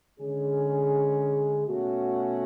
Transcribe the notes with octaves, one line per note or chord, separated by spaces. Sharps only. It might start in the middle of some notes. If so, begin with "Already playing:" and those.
D3 G#3 C#4 G#4
B2 A3 C#4 F#4